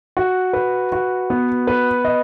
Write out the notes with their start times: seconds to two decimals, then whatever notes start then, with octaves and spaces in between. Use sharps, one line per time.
0.17 F#4
0.53 B4
0.92 F#4
1.30 B3
1.67 B4
2.05 D#5